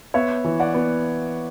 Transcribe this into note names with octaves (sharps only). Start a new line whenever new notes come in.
B3 C#5 E5
E3
D5 F#5
B3